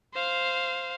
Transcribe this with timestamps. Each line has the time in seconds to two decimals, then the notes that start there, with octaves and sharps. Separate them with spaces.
0.14 C5 F5